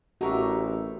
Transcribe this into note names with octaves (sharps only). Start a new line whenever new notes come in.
A1 D#4 F#4 G4 A#4 E5